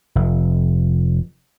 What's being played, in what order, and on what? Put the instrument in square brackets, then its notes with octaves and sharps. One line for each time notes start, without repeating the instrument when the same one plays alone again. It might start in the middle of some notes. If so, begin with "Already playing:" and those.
[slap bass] F1